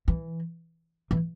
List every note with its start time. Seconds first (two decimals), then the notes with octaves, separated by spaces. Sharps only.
0.08 E3
1.11 E3